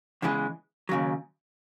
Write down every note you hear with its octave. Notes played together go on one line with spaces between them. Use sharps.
E2 C#3 E3 G#3
D#2 C#3 F#3